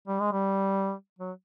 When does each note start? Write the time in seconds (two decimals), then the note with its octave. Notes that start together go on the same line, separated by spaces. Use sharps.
0.08 G3
0.19 G#3
0.32 G3
1.19 F#3